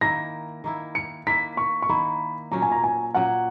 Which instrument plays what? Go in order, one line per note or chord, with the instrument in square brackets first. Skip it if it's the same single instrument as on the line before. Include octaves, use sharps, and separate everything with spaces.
[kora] D#3 A#3 E4 [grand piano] A#6
[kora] D#3 A#3 E4
[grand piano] C#7
[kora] D#3 A#3 E4 [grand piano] B6
[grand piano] C#6
C#6
[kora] D#3 A#3 E4 [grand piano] B5
[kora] A#2 F#3 C#4 [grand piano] A#5
[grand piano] G#5
A#5
G#5
[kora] A#2 F#3 C#4 [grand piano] F#5